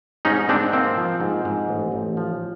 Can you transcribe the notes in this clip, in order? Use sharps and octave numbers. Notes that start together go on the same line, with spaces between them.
G#2 C#4 D#4
G#2 C4 D4
A#3 C4
F3
G#2
G#2
A1
A1
F3